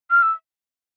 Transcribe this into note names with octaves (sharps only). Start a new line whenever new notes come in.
F6
E6